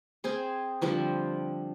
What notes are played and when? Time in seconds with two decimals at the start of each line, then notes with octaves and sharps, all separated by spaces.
0.24 C4 G#4 C5
0.81 D3 F3 G3 C4